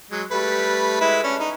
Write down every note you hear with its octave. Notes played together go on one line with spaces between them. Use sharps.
F#3 G#3
G3 A3 B4
G#3 E4 B4
C#4 D4
D#4